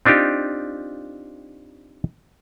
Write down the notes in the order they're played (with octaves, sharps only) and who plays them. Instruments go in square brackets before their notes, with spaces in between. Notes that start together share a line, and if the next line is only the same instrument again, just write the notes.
[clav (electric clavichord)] C4 D4 D#4 F4 G4